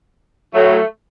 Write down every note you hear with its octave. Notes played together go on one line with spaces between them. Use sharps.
A2 F#3 A3